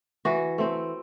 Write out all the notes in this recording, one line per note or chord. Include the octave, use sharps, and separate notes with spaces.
E3 F#4
A3 C4